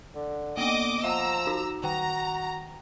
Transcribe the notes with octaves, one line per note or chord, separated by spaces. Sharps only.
D3
D3 A#3 B3 D#5 D6 D#6
F3 E5 F#5 A#5 D6 E6
D#4 F#4
D#3 F#4 G5 A#5